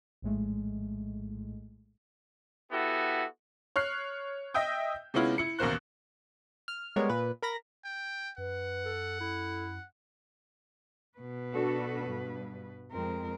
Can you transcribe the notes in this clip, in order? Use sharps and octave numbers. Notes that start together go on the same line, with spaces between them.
A#1 A2 G#3 A3
B3 E4 F#4 G4 A4
C#5 F6 F#6 C7
D#5 E5 G5 D#6 G6
C3 G#3 B3 C#4 E4 F4
E4 C#7
A1 D#2 B2 A#4 C5 F#6
F6
G3 G#3 B3 A#4 C#5
A#2 B4
A#4 B5 A#6
G5
F#2 B4 F#5
A4
E4 A4
B2 B4
D4 F#4 A4
G2
F2 G#3 C4 A#4